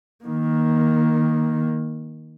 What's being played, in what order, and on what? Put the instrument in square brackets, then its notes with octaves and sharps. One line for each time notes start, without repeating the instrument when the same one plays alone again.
[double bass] D#3 A#3